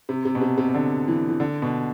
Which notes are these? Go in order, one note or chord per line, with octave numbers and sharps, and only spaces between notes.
C3
C3
B2
C3
C3
C3
D3
E3
E3
D3
B2